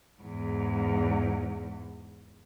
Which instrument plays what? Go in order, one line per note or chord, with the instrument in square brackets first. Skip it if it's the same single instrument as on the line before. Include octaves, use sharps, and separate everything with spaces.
[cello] E2 G#2